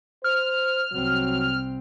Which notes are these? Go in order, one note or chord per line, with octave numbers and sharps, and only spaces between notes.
C5 F6
C2 F#3 C4